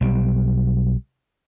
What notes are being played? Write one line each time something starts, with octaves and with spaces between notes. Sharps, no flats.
B1 G3